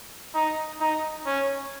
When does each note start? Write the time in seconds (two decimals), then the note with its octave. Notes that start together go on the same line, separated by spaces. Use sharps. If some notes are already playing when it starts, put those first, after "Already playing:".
0.35 D#4
0.80 D#4
1.26 C#4